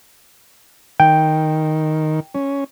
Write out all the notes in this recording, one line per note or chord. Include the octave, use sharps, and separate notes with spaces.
D#3 G5
C#4